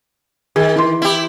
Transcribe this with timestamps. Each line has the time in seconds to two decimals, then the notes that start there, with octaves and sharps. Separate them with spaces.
0.56 D#3 G#4
0.76 E3 C6
1.02 E4 G4